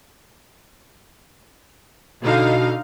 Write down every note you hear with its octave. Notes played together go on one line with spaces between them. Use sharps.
B2 D3 D#4 F5